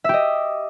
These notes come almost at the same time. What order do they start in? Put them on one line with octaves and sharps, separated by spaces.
E5 G4 D#5